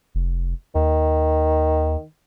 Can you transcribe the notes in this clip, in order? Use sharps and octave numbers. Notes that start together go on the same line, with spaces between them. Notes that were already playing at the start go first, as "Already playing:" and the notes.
F1
D#2 D#3